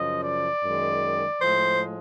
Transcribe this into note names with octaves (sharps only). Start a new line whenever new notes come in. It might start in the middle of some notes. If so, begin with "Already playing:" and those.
Already playing: F#2 C#3 F3 D#5
D5
F#2 D#3 G#3
A2 F3 G#3 C5